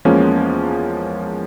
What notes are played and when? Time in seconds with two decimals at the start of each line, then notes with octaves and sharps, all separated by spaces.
0.05 E2 F3 G#3 A#3 C#4